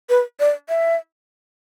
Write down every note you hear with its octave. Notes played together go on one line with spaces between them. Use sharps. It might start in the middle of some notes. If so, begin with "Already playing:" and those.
B4
D5
E5